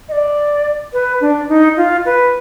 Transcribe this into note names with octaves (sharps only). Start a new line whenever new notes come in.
D#5
D5
B4
D4
D#4
F4
B4